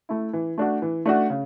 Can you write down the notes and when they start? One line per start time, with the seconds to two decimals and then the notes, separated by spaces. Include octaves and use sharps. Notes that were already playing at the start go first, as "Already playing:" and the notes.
0.09 A3 E4
0.33 E3
0.58 A3 D4 F#4
0.82 E3
1.05 A3 D4 F#4
1.30 C#3